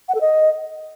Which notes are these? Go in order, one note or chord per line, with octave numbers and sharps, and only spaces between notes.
F#5
A4
D#5